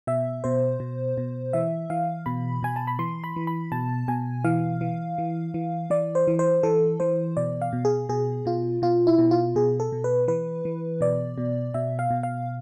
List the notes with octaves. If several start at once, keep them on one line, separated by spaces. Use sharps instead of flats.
B2 E5
B2 C5
B2
B2
E3 E5
E3 F5
B2 B5
B2 G#5
A5
B5
E3 C6
B5
E3
B5
B2 A5
B2 G#5
E3 F5
E3
E3
E3
E3 D5
C5
E3
C5
E3 A4
E3 C5
B2 D5
F5
B2
G#4
B2 G#4
B2 F4
B2 F4
E4
B2
F4
B2 G#4
A4
B2
B4
E3 B4
E3
B2 D5
B2
B2 E5
F5
B2
F5